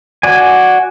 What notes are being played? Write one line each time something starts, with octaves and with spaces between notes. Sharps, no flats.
F#4 D5 G#5